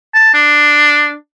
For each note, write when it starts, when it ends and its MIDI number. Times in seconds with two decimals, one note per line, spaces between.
0.14 0.31 81
0.34 1.14 62